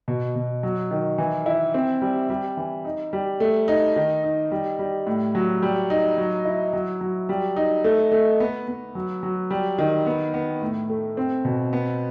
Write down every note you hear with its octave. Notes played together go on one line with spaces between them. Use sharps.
B2
B2
F#3
D#3
E3
E4
C4
G3
G3
E3
D#4
G3
A3
D#4
D#3
D#4
G3
G3
A2
F#3
G3
D#4
F#3
E4
F#3
F#3
G3
D#4
A3
A3
B3
B3
F#3
F#3
G3
D#3
B3
B3
A2
A3
C4
B2
B3